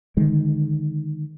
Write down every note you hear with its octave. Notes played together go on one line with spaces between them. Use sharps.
D3 D#3 G#3